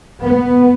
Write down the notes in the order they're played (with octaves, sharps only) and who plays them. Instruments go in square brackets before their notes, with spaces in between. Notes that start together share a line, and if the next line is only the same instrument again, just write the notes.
[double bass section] B3